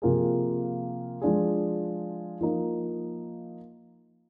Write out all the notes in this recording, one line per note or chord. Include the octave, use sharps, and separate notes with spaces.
C3 F3 A#3 F4 G#4
F3 G#3 D4 F4 G#4
F3 A#3 D#4